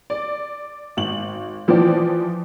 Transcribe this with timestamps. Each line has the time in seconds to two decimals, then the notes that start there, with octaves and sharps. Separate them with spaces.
0.10 D5
0.97 G#1 F#7
1.68 E3 F3 C5 D5 G5